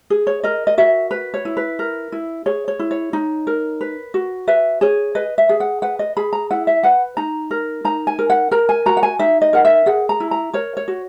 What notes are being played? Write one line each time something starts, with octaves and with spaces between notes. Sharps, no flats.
G#4
C#5
A#4 D#5
D#5
F#4 E5
B4
C#5
E4
B4
A#4
E4
G#4 C#5
C#5
E4
C#5
D#4
A#4
B4
F#4
B4 E5
G#4 C#5
B4 D#5
E5
G#4
F#5
B4 F#5
D#5
G#4 B5
A#5
E4 F#5
E5
B4 F#5
D#4 A#5
A#4
D#4 A#5
G#5
A#4
F#5
A#4 A#5
G#5
F#4 A#5
F#5
G#5
D#4 E5
D#5
A#4 F#5
E5
G#4 F#5
A#5
E4
A#5
A#4 C#5
C#5
F#4